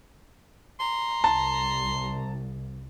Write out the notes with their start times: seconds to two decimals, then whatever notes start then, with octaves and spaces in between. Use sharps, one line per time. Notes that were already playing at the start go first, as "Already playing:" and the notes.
0.80 A#5 C6
1.24 C2 A5